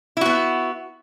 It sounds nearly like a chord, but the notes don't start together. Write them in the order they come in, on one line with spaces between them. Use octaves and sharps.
E4 F#4 B3